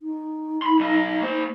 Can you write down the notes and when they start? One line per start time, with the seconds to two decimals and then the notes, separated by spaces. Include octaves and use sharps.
0.02 D#4
0.62 B5 C6
0.79 B1 D#5
1.21 A#3 C5